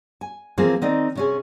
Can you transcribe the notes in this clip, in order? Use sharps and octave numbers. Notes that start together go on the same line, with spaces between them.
G#5
E3 F3 A#3 C4 F4 G#4
D#3 C4 D#4 D5 D#5
C3 C#4 G#4